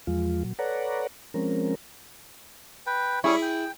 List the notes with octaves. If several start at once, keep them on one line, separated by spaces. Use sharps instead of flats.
E2 F3 G#3 F4
A#2 F#3
A4 B4 C#5 D5 F#5 A#5
F3 G#3 C4 C#4 A#4
B4 G5
G3 E4 G#4 C#5 C#6
G5